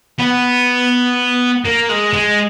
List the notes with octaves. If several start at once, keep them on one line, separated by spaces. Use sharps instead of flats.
B3
A#3
G#3
G#3